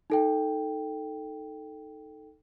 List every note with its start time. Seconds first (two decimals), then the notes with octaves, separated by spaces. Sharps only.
0.10 D#4 A4 G5